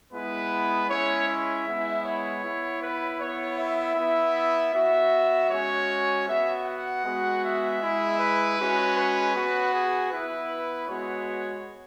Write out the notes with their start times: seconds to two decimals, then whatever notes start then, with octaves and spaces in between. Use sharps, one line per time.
0.13 G#3 B3 E4 B4
0.90 G#3 C#4 E4 C#5
1.28 E5
1.66 G#3 B3 E4
2.05 C#5
2.43 B3 E4
2.82 B4
3.20 B3 E4 C#5
3.59 E5
3.97 B3 E4
4.74 B3 F#4 E5
5.50 G#3 C#4 F#4 C#5
6.27 B3 F#4 E5
6.66 F#5
7.05 G#3 B3 F#4
7.43 E5
7.81 G#3 E4
8.19 B4
8.58 G#3 C#4 F#4
8.97 B4
9.35 B3 F#4
9.74 G#4
10.12 B3 E4 B4
10.88 G#3 B3 F#4 C#5